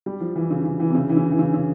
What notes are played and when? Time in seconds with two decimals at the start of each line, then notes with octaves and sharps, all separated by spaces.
0.06 G3
0.21 F3
0.36 E3
0.50 C#3
0.65 C#3
0.80 E3
0.90 C3
0.95 C#3
1.09 E3
1.17 C#3
1.31 E3
1.39 C#3
1.54 C#3